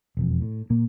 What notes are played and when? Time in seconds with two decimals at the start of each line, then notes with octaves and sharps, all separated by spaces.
0.17 E1 F2
0.42 A2
0.70 A#2 A#3